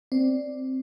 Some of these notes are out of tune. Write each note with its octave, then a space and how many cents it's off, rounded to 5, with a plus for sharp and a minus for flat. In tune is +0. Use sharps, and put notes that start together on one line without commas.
C4 +0 D5 +0